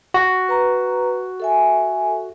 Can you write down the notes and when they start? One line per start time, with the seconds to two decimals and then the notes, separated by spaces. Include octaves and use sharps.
0.14 F#4
0.49 B4 A#5
1.40 A4 E5 G#5